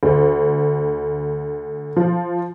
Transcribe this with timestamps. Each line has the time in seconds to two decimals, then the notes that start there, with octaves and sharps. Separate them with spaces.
0.03 D2
1.96 F3